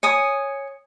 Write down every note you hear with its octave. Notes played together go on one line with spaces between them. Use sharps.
C#5 G#5 D#6